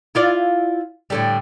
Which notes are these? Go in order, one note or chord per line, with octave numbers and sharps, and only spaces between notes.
E4 F4 D5
A2 D3 G3